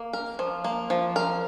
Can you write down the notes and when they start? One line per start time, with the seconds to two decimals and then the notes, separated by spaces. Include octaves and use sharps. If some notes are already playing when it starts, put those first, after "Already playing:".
Already playing: A#3
0.13 A#4
0.39 F3
0.64 A#3
0.90 F3
1.16 A#4